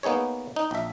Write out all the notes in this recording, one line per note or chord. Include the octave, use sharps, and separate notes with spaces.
A#3 B3 D#4 G#4 C#5
D#4
A#1 E5